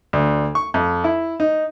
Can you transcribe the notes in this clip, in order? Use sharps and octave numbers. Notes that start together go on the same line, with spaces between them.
D2
C#6
F2
E4
D#4